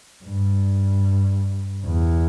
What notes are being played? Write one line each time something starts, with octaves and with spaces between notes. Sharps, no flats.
G2
E2